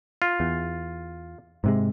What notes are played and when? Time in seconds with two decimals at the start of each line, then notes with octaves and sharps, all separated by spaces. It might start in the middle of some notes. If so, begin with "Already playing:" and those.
0.22 F4
0.40 E2
1.64 G#2 C3 G#3